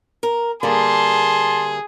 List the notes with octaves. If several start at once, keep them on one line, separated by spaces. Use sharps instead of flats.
A#4
D3 G3 A#3 G#4 A5 C6